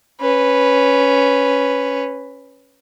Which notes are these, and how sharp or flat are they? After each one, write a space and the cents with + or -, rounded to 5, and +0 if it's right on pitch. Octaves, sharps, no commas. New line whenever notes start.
C#4 +0 B4 +0